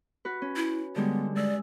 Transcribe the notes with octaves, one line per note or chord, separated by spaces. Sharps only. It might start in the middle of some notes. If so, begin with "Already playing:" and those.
F#4 B4
C#4
E4
D3 G3 G#3 B3
G#3 D5 E6